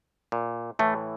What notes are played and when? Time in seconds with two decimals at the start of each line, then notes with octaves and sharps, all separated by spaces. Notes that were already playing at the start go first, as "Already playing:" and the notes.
0.32 A#2
0.79 A2 E3 A3